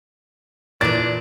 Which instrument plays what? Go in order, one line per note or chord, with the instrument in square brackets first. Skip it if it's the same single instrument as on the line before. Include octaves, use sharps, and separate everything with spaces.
[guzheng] A#2 E3 [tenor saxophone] D4 [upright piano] A6